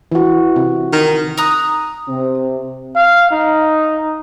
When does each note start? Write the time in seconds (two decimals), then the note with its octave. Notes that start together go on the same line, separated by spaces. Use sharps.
0.12 E3 F#4
0.56 C3
0.93 D#3
1.38 A#5 D#6 F#6
2.07 C3 C4
2.96 F5
3.31 D#4